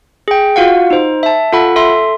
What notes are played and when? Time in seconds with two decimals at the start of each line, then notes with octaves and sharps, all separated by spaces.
0.28 G#4 G5
0.56 F4 F#4 F5 F#5
0.90 D#4 C5
1.23 E5 A5
1.53 F4 A4 F#5 B5
1.76 A4 E5 C6